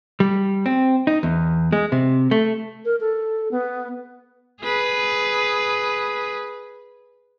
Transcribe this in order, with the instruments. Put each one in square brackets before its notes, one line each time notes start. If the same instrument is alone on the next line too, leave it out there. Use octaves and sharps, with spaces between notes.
[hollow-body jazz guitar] G3
C4
D#4
E2
G#3
C3
A3
[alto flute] A#4
A4
B3
[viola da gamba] G#4 B4